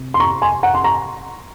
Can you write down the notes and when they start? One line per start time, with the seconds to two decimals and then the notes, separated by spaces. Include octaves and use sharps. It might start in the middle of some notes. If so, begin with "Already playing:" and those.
Already playing: C3
0.14 C6
0.20 A#5 C#6
0.42 G#5 C6
0.63 F#5 A#5
0.75 C6
0.84 A#5 C#6